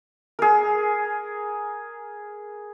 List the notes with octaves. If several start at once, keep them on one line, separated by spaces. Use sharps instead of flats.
G#4 A#4